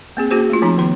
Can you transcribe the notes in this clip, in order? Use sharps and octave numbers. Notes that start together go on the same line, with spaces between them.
A#3 C4 G#4
A#3 C#4 F#4 G#4 C5
A3 F4
F3 C4 D#4 A#5
D#3 B3 C6